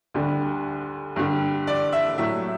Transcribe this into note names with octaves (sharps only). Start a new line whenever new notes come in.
D2 D3 G3
G2 D3 G3
D5
E5
A2 F#3 A3 E5